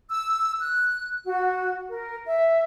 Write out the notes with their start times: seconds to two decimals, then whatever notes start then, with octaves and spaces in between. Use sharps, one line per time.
0.08 E6
0.60 F#6
1.23 F#4
1.89 A#4
2.24 E5